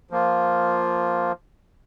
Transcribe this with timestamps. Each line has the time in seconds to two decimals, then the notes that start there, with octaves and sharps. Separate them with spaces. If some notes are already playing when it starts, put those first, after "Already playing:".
0.11 F3 A#3 F4